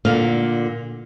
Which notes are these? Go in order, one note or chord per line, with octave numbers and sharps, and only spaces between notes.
A#2 D3 F5